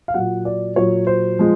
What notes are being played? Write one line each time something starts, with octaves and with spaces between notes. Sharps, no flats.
F5
A#2 F#3 F#5
D5
A#2 F#3 C#5
C5
F3 G#3